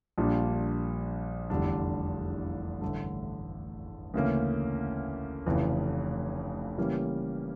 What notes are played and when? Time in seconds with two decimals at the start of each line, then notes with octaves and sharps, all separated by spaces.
0.18 A#1 A#2 G3 D4
1.50 F1 E2 D3 G3 D4
2.81 A1 G2 D3 A3
4.14 D2 C#3 E3 A#3 C#4
5.46 F1 F2 C#3 E3
6.78 C#3 E3 G3 A#3 C#4